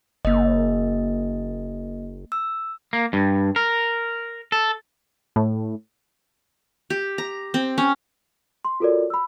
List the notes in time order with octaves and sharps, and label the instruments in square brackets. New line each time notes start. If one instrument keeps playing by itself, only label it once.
[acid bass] F#1 [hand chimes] A#3 D#5
[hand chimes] E6
[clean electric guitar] A#3
G2
A#4
A4
[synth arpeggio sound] A2
[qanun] G4
A#5
C4
C#4
[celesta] C6
F4 F#4 A4 A#4 C#5 D5
B5 E6